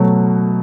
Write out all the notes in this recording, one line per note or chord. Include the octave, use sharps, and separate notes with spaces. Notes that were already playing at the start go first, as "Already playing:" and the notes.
Already playing: B2 F#3 A3